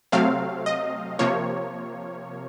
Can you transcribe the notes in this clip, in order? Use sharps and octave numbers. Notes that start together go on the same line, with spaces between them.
C3 F#3 A3 C4 F5
D#5
C3 F3 A#3 C#5